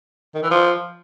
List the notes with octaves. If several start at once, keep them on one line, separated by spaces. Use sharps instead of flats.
D#3
E3
F3